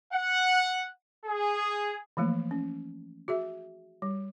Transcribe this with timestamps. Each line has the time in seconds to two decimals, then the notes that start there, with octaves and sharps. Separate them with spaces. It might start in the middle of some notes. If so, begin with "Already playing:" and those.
0.13 F#5
1.25 G#4
2.17 E3 F3 A3 A#3
2.51 C#4
3.28 F#4 G#4 E5
4.02 G3